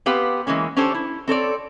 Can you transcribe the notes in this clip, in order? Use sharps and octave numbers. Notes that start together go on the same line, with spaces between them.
B3 C4 G4 B4 F5
E3 G#3 A#3 C#4
C#4 D4 G4 A4 C5 C#5
E4
C4 A4 C#5 D5